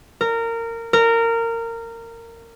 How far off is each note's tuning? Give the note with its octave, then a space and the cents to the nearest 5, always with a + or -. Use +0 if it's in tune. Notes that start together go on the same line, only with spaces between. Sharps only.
A#4 -20
A#4 -20